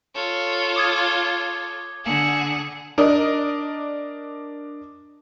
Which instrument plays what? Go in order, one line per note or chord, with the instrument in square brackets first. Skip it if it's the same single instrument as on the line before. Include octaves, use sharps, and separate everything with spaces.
[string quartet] F4 A4 C#5
[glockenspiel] D6 D#6 G#6
G7
[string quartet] D3 G#4 F#5
[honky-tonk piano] D4 A#4 D5 D#5